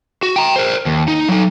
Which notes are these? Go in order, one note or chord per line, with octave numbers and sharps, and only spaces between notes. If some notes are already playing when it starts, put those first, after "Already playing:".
F#4
G5 A#5
A#4 C5
D#2
D#4
F#3 D#4